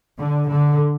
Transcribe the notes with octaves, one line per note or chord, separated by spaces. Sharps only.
D3
D3